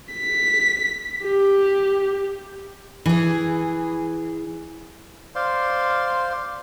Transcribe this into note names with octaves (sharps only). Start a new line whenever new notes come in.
B6
G4
E3 G#4
C5 D5 F5 C6